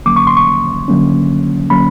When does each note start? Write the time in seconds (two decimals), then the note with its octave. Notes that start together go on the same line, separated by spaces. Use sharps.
0.06 D3 F#3 A#3 C#4 D6
0.16 C#6
0.27 C6
0.37 C#6
0.88 D3 F#3 A#3 C#4
1.70 D3 F#3 A#3 C#4 B5